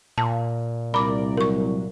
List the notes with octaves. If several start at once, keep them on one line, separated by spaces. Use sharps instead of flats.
A#2 A5
C2 A#4 D5 B5 D6
F#3 A#4 C#6